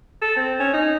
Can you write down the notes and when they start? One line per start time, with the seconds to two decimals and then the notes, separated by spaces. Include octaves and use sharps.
0.22 A4
0.37 C4
0.60 C#4
0.74 D#4